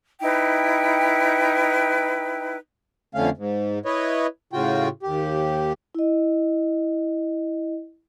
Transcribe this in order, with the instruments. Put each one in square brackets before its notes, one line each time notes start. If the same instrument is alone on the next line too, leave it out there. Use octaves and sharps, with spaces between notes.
[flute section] D#4 E4 B4 G5
[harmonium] F2 D3 A3 C#4 F5
G#2
E4 B4 C#5 D#5
A2 C#3 F4 F#4 G5
D#2 G4
[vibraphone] E4 D#5